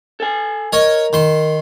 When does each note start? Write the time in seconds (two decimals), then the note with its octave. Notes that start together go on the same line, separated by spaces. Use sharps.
0.20 A4 G#5
0.73 A#4 C#5 D#5
1.13 D#3 C6